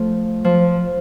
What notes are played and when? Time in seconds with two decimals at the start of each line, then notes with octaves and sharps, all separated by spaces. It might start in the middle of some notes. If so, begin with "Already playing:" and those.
Already playing: F3 A3
0.45 F3